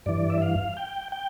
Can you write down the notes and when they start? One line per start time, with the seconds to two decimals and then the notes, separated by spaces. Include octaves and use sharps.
0.06 G2 E3 D5
0.30 E5
0.42 F5
0.77 G5
1.12 G5